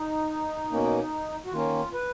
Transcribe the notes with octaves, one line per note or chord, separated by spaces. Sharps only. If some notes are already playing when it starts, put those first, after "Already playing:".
Already playing: D#4
B2 A#3 C#4
F#4
D#3 A#3 C#4 F4
B4